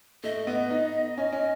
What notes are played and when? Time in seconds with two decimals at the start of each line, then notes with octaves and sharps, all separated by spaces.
0.23 A3 D#5
0.47 B3
0.70 D#4
1.17 C#4
1.33 C#4